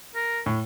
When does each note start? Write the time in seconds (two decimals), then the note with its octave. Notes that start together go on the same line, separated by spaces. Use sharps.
0.15 A#4
0.46 A2